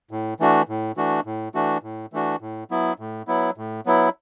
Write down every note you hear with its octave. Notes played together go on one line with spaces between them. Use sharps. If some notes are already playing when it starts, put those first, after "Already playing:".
A2
E3 A3 D4 F#4
A2
E3 A3 D4 F#4
A2
E3 A3 D4 F#4
A2
E3 A3 D4 F#4
A2
F#3 B3 E4
A2
F#3 B3 E4
A2
F#3 B3 E4